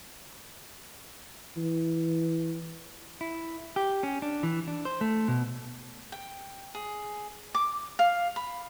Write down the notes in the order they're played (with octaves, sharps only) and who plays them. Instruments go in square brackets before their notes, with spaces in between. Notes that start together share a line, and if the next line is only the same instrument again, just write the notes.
[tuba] E3
[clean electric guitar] E4
G4
C#4
D4
E3
D4
C5
A3
B2
[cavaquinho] G5
G#4
D6
F5
B5